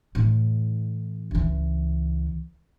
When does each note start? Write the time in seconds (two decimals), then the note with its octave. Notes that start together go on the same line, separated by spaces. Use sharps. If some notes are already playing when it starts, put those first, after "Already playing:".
0.15 A2 E3
1.31 C#2 E3